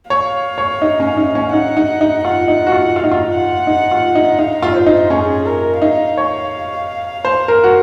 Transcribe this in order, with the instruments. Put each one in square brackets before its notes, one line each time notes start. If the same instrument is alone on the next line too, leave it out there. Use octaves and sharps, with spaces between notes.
[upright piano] C#5 [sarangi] F5
[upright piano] C#5
D#4
C#4
D#4
C#4
[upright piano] D#4 [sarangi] F#5
[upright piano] D#4
D#4
[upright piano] F4 [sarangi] F#5
[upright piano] D#4
F#4
F4
[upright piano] F4 [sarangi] F5
[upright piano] D#4
F4
[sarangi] F#5
[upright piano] D#4
F4
D#4
[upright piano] D#4 [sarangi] F5
[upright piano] F4
[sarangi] C5
[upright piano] D#4
[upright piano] C#4 [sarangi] G#4
[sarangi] A#4
[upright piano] D#4 [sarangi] F5
[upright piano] C#5
C5
A#4
F#4